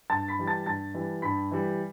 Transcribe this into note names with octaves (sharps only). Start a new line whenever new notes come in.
G2 A5 A6
B5 B6
E3 G3
A5 A6
G2 A5 A6
E3 G3
G2 B5 B6
E3 G3